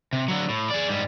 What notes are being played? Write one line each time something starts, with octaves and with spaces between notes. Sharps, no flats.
C3
D3 F#3
A2
G#4 D5
G#2 G3